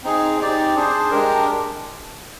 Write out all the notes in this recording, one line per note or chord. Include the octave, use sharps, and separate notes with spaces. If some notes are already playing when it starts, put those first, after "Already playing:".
C4 D#4 G#4
C4 D#4 G4 D5
D4 G#4 C5
G#3 D4 G4 A#4